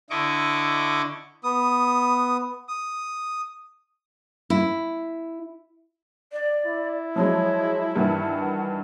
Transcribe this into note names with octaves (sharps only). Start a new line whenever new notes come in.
D3 E4 D#5 C#6 D6
B3 D#6
D#6
E4
D5
E4
F3 F#3 G#3 C#5
G2 D#3 E3 F#5